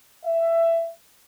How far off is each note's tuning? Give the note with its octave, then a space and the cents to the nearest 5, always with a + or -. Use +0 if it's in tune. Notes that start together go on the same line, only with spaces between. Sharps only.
E5 +15